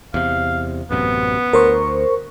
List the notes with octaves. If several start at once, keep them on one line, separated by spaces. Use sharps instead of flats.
E2 C3 F5
A1 F#2 C3 B3
D2 A#4 C5 C#6